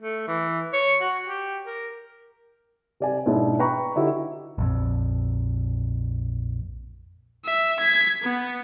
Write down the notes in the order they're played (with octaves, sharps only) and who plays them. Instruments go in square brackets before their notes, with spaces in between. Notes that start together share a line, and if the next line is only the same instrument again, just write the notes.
[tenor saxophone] A3
E3
C#5
F#4
G4
A#4
[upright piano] C3 D5 G#5
G#2 B2 D4 E4
B4 G5 A#5 C#6
D3 D#4 E4 F#4 G4
[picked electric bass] A#1 F2
[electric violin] E5
G#6 B6
B3